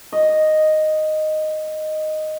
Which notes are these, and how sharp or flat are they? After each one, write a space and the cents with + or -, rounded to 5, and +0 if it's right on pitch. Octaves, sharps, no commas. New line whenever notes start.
D#5 -5